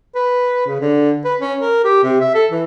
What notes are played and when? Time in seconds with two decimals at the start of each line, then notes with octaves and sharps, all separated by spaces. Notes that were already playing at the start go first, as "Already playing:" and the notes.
0.15 B4
0.66 C#3
0.80 D3
1.25 B4
1.41 C#4
1.61 A#4
1.84 G4
2.03 C3
2.21 E5
2.34 A4
2.51 E3